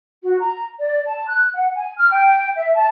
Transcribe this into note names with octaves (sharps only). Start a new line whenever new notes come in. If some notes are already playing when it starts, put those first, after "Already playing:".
F#4
A#5
D5
A5
F#6
F#5
G#5
F6
G5
E5
A5